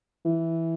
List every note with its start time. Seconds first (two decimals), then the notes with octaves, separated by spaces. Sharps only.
0.25 E3